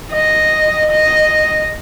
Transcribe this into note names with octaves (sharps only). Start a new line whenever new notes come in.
D#5
D#5